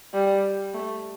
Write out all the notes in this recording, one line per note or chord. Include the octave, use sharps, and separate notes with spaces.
G3
A3